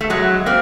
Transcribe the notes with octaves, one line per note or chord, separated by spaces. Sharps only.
A3
F#3 G#3
A#3 C4